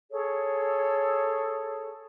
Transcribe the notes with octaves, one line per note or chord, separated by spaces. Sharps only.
G#4 A4 C#5